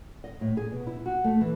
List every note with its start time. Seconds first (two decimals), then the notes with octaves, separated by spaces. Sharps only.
0.24 D#5
0.41 A2
0.57 G#4
0.72 B2
0.87 E4
1.06 F#4
1.24 A3
1.41 E3